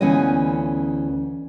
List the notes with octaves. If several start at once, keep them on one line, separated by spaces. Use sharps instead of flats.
D2 E3 B3 C#4 F4 D#5